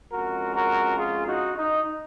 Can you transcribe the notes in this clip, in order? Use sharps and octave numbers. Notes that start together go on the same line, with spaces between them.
F2 C#3 G#3 F#4 A#4
F#4 A#4
F4 G#4
D#4 F#4
D#4